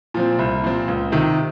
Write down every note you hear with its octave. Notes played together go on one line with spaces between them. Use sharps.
A#2 F3 C4
C2
A#2 F3 C4
C#2
C3 D#3